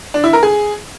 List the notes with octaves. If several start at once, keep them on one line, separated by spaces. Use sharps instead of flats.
D4
E4
A#4
G#4